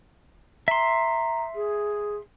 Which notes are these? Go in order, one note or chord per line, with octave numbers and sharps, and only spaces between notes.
E5 A#5 C6
G#4